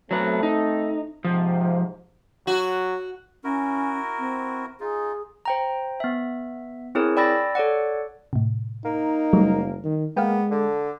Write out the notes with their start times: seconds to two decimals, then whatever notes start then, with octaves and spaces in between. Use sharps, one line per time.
0.11 F#3 A3 C4 B4
0.43 D#4
1.25 G#2 C3 F3
2.47 F#3 F#4
3.44 C#4 E4 F#4 A#4
4.19 C4
4.80 D#4 F4 G#4
5.45 C5 G5 A#5
6.00 B3 E5
6.95 C4 E4 G#4 A#4 C#5
7.17 D5 G5 B5 E6 A6 A#6
7.55 A4 C#5 D5 F#5
8.33 A2 C3
8.85 A#3 D#4
9.33 F#1 F#3 G3 A3
9.84 D#3
10.17 G#3 A#3 B3 F5 G5
10.51 D3 A4